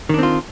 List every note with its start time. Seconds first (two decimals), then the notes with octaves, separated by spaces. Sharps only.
0.09 D#3
0.14 D4
0.18 C4
0.23 F4